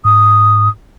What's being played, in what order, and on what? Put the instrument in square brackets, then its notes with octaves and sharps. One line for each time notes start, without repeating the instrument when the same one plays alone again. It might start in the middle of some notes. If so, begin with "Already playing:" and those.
[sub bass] G#2 [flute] D#6